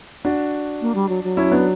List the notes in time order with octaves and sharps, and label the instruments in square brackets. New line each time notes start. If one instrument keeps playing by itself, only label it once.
[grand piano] D4 F#4
[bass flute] A#3
G3
F#3
F#3
[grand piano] C#4 E4
B3 D4